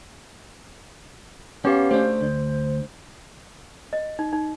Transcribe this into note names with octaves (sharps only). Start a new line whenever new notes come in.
B3 C#4 G4 C#5 F5
A3 D4 C5
D2
D#5
D#4
D#4